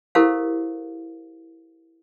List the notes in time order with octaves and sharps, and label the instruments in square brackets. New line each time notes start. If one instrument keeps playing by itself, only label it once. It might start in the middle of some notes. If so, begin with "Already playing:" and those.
[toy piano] E4 G4 A4 A#4 C5 F5